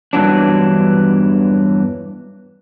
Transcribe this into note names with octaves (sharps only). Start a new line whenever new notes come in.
E2 G2 E3 F#3 D4